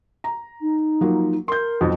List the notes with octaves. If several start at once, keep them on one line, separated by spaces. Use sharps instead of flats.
A#5
D#4
F3 F#3 A#3
A#4 C6 G6
B1 F2 C4